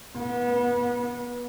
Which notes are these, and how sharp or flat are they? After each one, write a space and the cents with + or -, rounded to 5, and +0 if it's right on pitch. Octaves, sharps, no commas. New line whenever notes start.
B3 -30